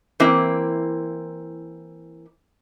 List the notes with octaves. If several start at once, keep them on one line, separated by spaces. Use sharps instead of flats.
E3 A#3 C4 E4